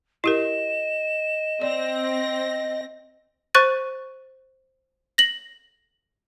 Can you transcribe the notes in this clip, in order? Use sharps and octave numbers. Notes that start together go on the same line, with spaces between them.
E4 G4 A#4 D#5 E7
C4 D5 A#6
C5 C#6 F#6 A6 D#7
A#6 F#7